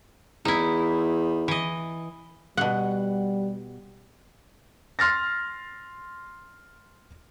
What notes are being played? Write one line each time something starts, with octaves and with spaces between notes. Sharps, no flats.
E2 D#4 E4
E3 D#5
B2 G3 F#5
C6 F6 A6 A#6